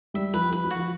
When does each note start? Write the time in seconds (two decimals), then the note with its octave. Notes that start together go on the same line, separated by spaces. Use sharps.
0.14 G3 E5
0.34 F3 B4
0.51 F3 B4
0.64 F#3
0.70 F#4
0.76 F3